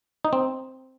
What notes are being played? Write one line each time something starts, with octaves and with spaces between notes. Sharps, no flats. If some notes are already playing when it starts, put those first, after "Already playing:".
D#4
C4